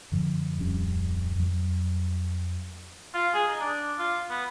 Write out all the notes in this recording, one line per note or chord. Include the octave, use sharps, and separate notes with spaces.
F#2 D3 F3
D1 F2 G3 C#4
F2 F#3
F4
G#4
D#4
D4
F4
B3